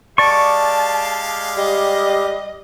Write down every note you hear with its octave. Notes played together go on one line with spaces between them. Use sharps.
G#3 G4 D5 F5 A5 C#6
G3 D#5